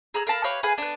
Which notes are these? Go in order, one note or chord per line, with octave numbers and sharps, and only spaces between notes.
G#4 A#5 E6 F#6
A#4 F5 A5 B5
G4 B4 C#5 F5
G#4 B4 F5 G#5
B3 D4